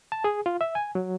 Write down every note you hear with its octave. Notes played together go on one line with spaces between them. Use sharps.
A5
G#4
F4
E5
G#5
F#3